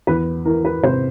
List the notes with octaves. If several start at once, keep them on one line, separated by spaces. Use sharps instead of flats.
E2 B4
E3 A#4
B4
C3 C5